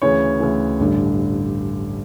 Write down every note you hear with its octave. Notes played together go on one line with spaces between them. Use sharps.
D2 C#3 E3 C#5
D2 C#3 E3
A1 G2 D3